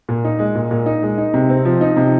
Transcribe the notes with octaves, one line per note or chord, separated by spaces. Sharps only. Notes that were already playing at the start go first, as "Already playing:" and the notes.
A#2
D#4
G#3
A#2
A#2
D#4
G#3
D#4
C3
C4
F3
D#4
C3